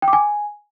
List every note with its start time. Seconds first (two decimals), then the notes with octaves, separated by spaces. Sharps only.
0.02 G5
0.08 D6
0.13 G#5